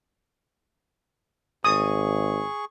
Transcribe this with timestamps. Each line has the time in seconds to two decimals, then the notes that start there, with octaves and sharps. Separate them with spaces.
1.64 G#1 G#4 C#6 D#6